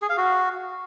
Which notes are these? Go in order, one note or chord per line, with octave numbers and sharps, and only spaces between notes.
G#4
F5
F#4